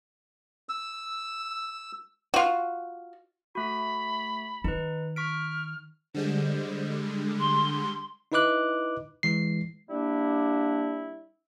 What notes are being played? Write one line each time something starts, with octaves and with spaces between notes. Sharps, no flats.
E6
F4 F#4
A3 F#4 B5
D#3 D#4 B4
C#6 F6 B6 D7
D3 G3 G#3 C5
C6
D#4 E4 B4 D#5 D6 F#6
E3 G#3 C7
G3 A#3 D4 E4